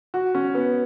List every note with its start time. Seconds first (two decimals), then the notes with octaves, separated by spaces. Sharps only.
0.14 F#4
0.35 C#4
0.55 B3